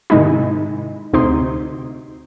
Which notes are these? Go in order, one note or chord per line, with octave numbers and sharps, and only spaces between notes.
G#2 C3 D#3 G#3 D#4 E4
D2 C3 D#4 C6